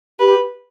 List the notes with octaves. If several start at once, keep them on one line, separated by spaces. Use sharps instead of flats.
G4 B4